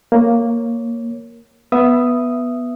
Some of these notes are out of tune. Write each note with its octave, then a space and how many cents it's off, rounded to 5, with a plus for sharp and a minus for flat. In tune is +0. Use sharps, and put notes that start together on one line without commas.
A#3 +0 C#5 +0
B3 -5 E5 +15 D#6 +0